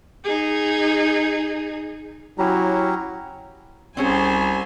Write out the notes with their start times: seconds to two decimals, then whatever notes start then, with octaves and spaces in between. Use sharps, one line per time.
0.24 D#4 G#4
2.39 F#3 C#4 E4 G4 A#5
3.97 C2 C4 C#4 G4 G#4 C5 G#5